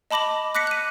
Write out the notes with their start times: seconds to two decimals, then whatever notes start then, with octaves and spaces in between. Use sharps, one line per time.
0.11 D#5 A5 B5 D6 A#6 F#7
0.55 D6 F#6 A#6 B6 C#7
0.67 F#6 D#7